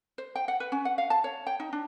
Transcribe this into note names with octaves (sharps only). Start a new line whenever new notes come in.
C5
G5
F#5
B4
C#4
F#5
F5
A5
C#5
G5
D#4
D4